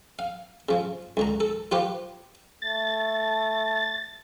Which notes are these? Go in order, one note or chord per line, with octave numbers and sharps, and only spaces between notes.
F5
C#3 F3
C#2 D3 A#5
A4
F3 F4 G4 B4 C5
A3 A6